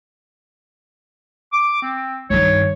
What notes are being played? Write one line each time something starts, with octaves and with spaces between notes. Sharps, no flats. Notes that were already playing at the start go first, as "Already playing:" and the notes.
D6
C4
G2 D#3 C#5